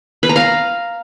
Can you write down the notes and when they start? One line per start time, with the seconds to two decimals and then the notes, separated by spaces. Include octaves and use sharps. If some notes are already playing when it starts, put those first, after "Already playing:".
0.23 B4
0.29 A#5
0.36 F5